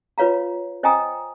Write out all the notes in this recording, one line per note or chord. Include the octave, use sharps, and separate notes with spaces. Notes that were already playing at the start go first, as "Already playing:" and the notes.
F4 B4 C#5 F5 A#5
C5 D#5 G5 G#5 A#5 D#6